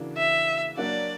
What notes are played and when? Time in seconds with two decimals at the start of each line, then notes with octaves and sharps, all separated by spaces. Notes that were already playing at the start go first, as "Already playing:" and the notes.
Already playing: C#3 E3 A#3 D4 F#4
0.17 E5
0.77 F#3 A#3 D4 F#4 D5